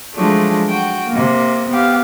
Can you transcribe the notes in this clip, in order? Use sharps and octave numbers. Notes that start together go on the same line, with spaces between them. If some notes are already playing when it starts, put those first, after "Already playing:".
F3 F#3 G#3 A3 D4
F#4 G5
C3 A#3
B3 G4 F5